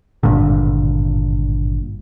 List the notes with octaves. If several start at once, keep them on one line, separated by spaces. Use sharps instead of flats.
G#1 G2 A#2 D3